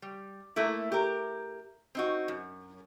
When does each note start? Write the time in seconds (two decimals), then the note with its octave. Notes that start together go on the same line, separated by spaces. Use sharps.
0.02 G3
0.56 A3 A#3 E4
0.92 G4 A#4
1.95 C4 D#4 F#4
2.28 F#2